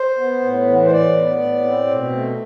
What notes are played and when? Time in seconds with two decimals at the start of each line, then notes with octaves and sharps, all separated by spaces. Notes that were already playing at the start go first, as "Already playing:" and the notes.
Already playing: C5
0.19 B3
0.42 A2
0.68 E3
0.85 C5
0.91 A2 D5
1.15 B3
1.40 A2
1.63 C4
1.87 B2
2.12 A3